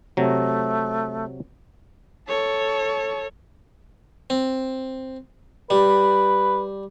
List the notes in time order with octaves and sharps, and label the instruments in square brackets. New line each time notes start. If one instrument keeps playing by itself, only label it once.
[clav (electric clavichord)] C3 F#3 [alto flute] A3
[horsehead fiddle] A4 C#5
[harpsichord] C4
[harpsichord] G3 [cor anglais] B4